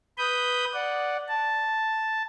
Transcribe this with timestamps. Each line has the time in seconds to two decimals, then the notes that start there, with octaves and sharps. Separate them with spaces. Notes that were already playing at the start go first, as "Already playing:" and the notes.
0.18 B4 B5 D#6 G6
0.73 D5 F#5
1.28 A5